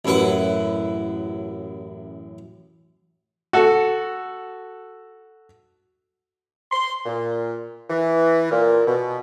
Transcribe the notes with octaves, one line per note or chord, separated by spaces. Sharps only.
A1 F#2 E4 B4 F#5
F#4 A4
C6
A#2
E3
A#2
B2